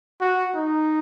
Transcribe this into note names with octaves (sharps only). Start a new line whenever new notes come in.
F#4
D#4